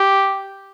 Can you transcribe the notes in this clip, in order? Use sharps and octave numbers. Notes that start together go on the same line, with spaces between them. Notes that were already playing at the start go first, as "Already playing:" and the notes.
Already playing: G4